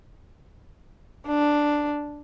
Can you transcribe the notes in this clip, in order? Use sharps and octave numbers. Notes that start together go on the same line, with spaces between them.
D4